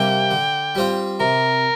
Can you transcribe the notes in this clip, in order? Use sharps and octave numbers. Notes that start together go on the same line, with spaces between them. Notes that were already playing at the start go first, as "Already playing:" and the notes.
Already playing: C3 G3 A#3 D4 G5
D3
G3 C4 F4
C3 A#4